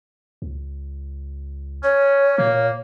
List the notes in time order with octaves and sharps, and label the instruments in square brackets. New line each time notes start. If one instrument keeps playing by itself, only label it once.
[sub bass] C#2
[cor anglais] C#4 [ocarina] C#5
[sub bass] A#2 [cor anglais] A#3